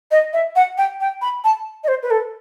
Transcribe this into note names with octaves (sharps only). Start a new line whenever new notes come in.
D#5
E5
F#5
G5
G5
B5
A5
D#5
C5
B4
A4